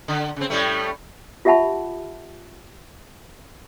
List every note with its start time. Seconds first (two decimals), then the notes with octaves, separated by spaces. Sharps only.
0.08 D3
0.36 C#3 C4
0.50 A2 G3 A3
1.45 F4 G4 E5 F#5 A5 B5